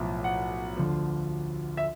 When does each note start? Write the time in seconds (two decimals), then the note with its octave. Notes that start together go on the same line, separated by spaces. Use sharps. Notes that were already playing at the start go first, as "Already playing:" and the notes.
Already playing: B1 A2 F3
0.24 F#5
0.77 D2 D3 F3
1.77 E5